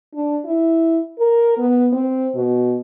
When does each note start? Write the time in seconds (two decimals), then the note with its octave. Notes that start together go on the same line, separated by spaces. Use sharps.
0.15 D4
0.45 E4
1.19 A#4
1.58 B3
1.92 C4
2.35 B2